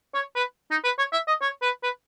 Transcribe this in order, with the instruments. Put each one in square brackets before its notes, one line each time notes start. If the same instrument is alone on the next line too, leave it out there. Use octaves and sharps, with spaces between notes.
[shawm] C#5
B4
D#4
B4
C#5
E5
D#5
C#5
B4
B4